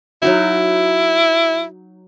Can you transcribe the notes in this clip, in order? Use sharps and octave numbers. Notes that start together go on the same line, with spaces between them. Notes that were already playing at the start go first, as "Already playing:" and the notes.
F#3 D#4 E4 F#4